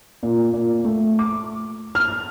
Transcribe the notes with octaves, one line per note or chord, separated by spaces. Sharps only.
A#2
A#2
A3
D6
F6